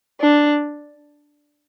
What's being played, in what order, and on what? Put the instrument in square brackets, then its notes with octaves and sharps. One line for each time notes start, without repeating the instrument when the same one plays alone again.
[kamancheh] D4